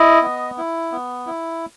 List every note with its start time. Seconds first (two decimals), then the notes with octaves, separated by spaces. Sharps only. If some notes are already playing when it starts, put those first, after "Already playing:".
Already playing: E4 D#5
0.22 B3
0.58 E4
0.92 B3
1.27 E4